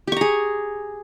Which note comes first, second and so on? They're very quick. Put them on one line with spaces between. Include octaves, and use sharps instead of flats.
G4 C#6 A#5 G#4